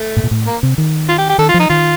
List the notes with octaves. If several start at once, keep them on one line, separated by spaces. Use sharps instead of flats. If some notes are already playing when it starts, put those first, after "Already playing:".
Already playing: A3
A2
A#2
A2
A#3
C3
D#3
F4
G4
G4
D#3 A4
F4
F3
D#4
D#3 F4